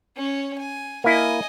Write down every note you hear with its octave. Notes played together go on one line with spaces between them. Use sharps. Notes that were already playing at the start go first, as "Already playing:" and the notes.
C#4 C#5
G#5
A#3 E4 D#5 G#5